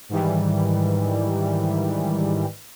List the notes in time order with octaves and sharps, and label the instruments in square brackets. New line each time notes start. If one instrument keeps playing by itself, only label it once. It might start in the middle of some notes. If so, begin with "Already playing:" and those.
[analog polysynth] G#2 D#3 E3 G3